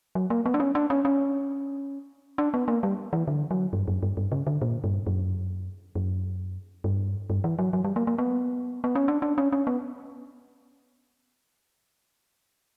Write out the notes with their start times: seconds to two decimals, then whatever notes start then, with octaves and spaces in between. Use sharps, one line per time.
0.15 F#3
0.30 A#3
0.46 B3
0.54 D4
0.60 C#4
0.75 D4
0.90 C#4
1.05 C#4
2.38 D4
2.54 B3
2.68 A#3
2.83 G3
3.13 E3
3.28 D3
3.51 F#3
3.73 G2
3.88 F#2
4.03 G2
4.17 G2
4.32 C#3
4.47 D3
4.62 A#2
4.84 G2
5.07 F#2
5.95 F#2
6.84 G2
7.30 G2
7.44 E3
7.59 F#3
7.73 F#3
7.85 G3
7.96 A#3
8.07 A#3
8.18 B3
8.84 B3
8.95 C#4
9.08 D4
9.22 D4
9.38 C#4
9.52 C#4
9.67 B3